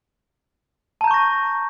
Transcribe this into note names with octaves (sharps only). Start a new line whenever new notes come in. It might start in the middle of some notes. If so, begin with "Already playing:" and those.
A5 A#5 C#6 G6 A#6